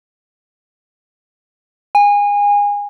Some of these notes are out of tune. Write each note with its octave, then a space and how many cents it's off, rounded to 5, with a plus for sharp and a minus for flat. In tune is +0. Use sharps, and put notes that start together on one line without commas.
G#5 -25